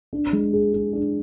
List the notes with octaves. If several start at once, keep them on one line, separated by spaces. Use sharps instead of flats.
D4
G#3
G#4
G#4
D4